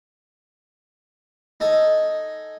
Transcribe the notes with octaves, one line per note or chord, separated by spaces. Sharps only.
D#4 A4 D#5 G#5